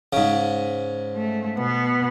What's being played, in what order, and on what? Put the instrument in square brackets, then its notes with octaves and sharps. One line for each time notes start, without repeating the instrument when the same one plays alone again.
[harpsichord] G#2 C#3
[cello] A3
B2 B3